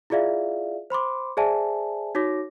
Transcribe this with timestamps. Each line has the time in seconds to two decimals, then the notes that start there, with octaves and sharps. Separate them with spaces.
0.10 E4 F4 G#4 D5 E5 F5
0.90 C5 B5 C6 D6
1.37 G#4 C5 D5 E5 G#5 A5
2.15 D#4 F#4 C#5 D6 A#6